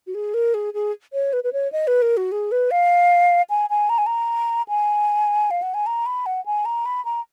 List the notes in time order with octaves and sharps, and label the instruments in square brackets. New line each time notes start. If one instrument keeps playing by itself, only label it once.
[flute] F#4
G#4
A#4
G#4
G#4
C#5
B4
B4
C#5
D#5
B4
A#4
F#4
G#4
B4
F5
G#5
G#5
A#5
G#5
A#5
G#5
F5
F#5
G#5
A#5
B5
F#5
G#5
A#5
B5
A#5